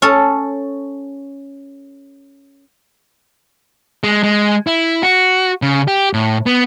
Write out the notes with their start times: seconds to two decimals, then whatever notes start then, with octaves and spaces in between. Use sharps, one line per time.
0.02 C#4 A4
4.04 G#3
4.23 G#3
4.67 E4
5.03 F#4
5.62 C#3
5.88 G4
6.13 A2
6.46 B3